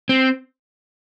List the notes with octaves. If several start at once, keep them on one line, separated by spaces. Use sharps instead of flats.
C4